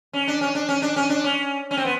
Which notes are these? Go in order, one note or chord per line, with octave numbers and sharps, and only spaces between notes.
C#4
D4
C#4
D4
C#4
D4
C#4
D4
C#4
C#4
C4
B3